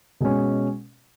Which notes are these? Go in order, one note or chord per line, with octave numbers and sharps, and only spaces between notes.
B2 G#3 C#4